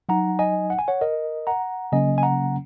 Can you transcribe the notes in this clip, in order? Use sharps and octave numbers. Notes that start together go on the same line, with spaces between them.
F#3 D#4 F#5 A#5
D#5 G#5
F#5
G#5
C#5 F#5
A#4 D#5
F#5 A#5
C#3 F#3 A#3 C#4 D#5 G#5
G#5
F#5 A#5